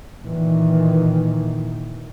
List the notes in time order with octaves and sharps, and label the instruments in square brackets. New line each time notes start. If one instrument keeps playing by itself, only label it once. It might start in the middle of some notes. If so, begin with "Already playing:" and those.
[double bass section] A#2 D#3 E3